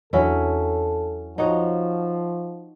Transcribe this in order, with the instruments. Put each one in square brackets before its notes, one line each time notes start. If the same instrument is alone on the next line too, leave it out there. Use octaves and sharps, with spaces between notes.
[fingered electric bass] E2 E3 D4 [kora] F#3 C#4 E4 [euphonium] A4
[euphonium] F3 [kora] D#4 F#4 C#5